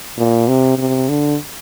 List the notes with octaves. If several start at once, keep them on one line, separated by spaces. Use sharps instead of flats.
A#2
C3
C3
D3